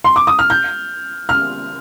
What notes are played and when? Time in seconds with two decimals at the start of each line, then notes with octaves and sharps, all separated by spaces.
0.04 C6
0.16 D6
0.27 D#6
0.39 F6
0.50 G6
1.29 F6